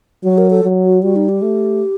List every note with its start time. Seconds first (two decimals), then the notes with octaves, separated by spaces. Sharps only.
0.24 F#3 F#4
0.38 A#4
0.50 A4
0.64 F#3
0.84 F#4
1.03 G3 F#4
1.16 D#4
1.29 G4
1.42 A3